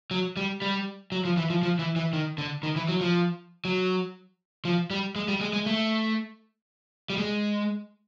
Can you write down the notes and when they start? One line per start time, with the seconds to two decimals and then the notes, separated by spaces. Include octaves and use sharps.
0.11 F#3
0.37 G3
0.62 G3
1.12 F#3
1.25 F3
1.37 E3
1.50 F3
1.63 F3
1.79 E3
1.96 E3
2.13 D#3
2.38 D3
2.63 D#3
2.76 E3
2.89 F#3
3.01 F3
3.65 F#3
4.65 F3
4.91 G3
5.16 G#3
5.28 G3
5.41 G#3
5.53 G#3
5.66 A3
7.10 G3
7.17 G#3